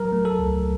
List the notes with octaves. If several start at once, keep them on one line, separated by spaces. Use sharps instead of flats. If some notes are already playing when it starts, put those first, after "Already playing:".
Already playing: F#3 A#4
A3
A4
C#2